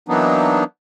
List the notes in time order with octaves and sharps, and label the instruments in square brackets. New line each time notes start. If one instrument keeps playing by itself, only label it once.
[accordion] E3 F#3 A#3 B3 D4 D#4